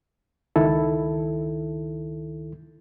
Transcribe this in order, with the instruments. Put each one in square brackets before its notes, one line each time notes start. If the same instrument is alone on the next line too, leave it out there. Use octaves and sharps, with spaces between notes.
[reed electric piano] C#2 D#3 E4 A4